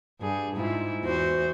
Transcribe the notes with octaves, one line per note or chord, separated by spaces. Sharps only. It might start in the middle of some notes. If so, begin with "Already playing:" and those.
G2 G#4
G#2 E4 F4
E2 F#4 C5